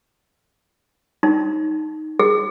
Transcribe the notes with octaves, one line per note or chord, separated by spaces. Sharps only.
D#4
G#4